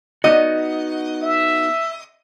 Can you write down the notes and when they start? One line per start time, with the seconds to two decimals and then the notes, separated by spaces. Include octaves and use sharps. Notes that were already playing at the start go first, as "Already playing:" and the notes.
0.24 B3 D#4 F#4 D#5
1.22 E5